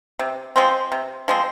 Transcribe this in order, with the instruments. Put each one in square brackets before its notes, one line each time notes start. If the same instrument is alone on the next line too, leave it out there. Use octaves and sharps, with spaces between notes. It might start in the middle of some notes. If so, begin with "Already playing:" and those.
[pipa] C3
F3 G#3 C4
C3
F3 G#3 C4